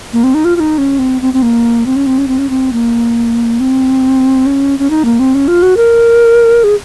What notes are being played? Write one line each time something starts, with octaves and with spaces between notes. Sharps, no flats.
A#3
C4
D#4
F4
F4
D#4
C#4
C4
C4
C4
A#3
C4
C#4
C4
C#4
C4
C#4
C4
A#3
C4
C#4
C#4
D#4
A#3
C4
C#4
F4
F#4
A#4
G#4